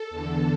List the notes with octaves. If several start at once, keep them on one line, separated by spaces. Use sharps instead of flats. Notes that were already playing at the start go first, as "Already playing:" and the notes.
Already playing: A4
E2 D3